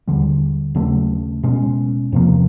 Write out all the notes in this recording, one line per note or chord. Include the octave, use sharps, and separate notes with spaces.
D#2 D3 G3
D#2 C#3 F#3 A3
B2 G#3 C#4
E2 C3 F3 A#3